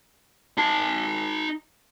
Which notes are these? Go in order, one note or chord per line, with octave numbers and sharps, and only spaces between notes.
D#4 A5